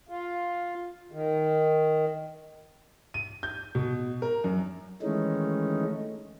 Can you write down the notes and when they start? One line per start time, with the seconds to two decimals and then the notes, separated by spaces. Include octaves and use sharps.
0.09 F4
1.12 D#3
3.14 D#7
3.43 G6
3.75 B2
4.22 A#4
4.44 F#2
5.02 D#3 E3 G#3 A3 C#4 D#4